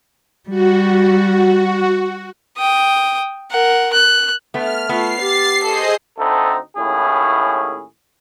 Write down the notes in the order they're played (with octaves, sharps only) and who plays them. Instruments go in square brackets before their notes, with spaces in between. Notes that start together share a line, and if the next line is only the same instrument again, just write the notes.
[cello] G3 [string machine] F#4
[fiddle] G5 D#6
A#4 F#5
F#6
[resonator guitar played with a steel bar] A3 B3 [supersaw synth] F6
[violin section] A3 [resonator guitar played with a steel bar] B3 [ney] F4 [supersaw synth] C7
[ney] G4 [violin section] A6
[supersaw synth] G#4 C5 D#5 [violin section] A4
[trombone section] D2 C4 D#4 A4
D#2 A2 C#4 E4 G#4